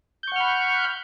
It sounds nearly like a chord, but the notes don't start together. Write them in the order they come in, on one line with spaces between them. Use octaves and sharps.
G6 C#6 F#5 F6 B5